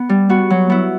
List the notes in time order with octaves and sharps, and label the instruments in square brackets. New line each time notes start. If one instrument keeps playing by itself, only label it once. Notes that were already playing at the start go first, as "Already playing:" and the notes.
Already playing: [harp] B3
G3
B3 F#4
F#3
B3 E4